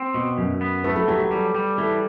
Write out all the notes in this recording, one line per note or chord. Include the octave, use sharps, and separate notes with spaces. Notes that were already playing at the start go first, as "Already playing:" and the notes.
Already playing: C4
B2
F#2
B3
A3 B4
A4
F#3 G4
G4
G3 A4
G3
E3 A4